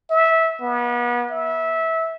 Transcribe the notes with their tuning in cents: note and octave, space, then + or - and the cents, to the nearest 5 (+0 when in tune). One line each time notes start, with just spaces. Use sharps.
E5 -15
B3 -35
E5 -20